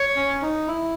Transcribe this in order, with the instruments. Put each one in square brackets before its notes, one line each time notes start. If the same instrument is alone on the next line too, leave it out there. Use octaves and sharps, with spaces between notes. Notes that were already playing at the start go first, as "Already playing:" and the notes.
Already playing: [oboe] C#5
[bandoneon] C#4
D#4
E4